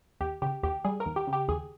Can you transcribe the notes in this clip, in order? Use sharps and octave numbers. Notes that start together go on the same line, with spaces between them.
D#2 G4
C#3 G4
D#2 G4
G3 G#4
A#4
D#2
G4
C#3
G4
D#2 G#4